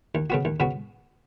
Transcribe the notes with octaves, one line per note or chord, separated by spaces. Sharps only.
D#2
C#3 B3 F#4
D#2
C#3 B3 F#4